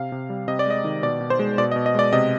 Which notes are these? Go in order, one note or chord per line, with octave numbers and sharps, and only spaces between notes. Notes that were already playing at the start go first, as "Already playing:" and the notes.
Already playing: C3 F5
C3
G3
C3 D#5
D5
G#3 D#5
D#3
B2 D5
B2
C5
G#3
B2 D5
D#5
B2
D#5
G#3 D5
C3 D#5